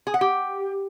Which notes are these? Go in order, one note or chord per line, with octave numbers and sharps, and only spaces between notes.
G#4
F#5
G4